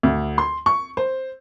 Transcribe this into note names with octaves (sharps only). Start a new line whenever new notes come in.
D2
C6
C#6
C5